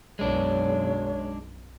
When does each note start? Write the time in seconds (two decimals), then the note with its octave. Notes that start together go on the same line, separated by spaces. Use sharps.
0.19 B1 F#2 G#3 D4 C#5